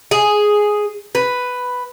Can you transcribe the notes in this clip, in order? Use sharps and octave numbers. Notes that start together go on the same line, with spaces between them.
G#4
B4